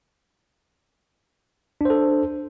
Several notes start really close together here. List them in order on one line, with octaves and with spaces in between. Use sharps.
D4 C5 A4